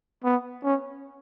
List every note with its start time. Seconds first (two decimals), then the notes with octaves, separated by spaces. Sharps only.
0.24 B3
0.63 C#4